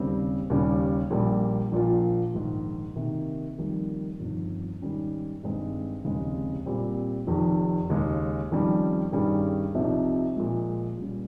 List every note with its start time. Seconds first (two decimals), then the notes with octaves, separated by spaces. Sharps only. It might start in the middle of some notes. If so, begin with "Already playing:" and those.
Already playing: D#2 C#3 G3 C4
0.50 D#2 C#3 G3 C#4
1.11 A#1 A#2 G3 A#3
1.72 A#1 A#2 F3 A#3 F4
2.34 A#1 G#2 D#3
2.96 C3 D#3 A#3
3.58 F2 D#3 G3 A#3
4.20 G1 F2 D#3
4.82 G#2 D#3 G3 C#4
5.43 G2 D#3 G#3 C4
6.04 F1 D#2 C#3 G#3 C4
6.66 A#2 G3 C4 G4
7.27 F1 F2 D#3
7.90 D#2 C#3 G#3 C#4
8.52 F2 D#3 G3 C#4
9.12 G2 D#3 G3 C#4 G#4
9.74 C2 C3 F3 C4 D#4
10.37 A#2 F3 G#3
10.98 A#2 G3 C#4